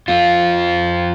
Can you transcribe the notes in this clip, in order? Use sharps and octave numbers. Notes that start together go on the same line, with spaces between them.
F2 F3 C4 F4